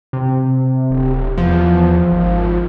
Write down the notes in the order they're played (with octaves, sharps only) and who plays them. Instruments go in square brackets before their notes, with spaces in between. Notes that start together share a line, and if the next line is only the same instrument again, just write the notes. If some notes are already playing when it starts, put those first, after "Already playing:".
[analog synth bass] C3
[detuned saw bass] D1
[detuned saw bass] E2 [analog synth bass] F3
[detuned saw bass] G#1